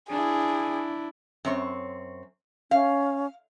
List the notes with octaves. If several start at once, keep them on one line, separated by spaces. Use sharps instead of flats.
D4 E4 G#4
F#2 C4 C#5
C#4 F5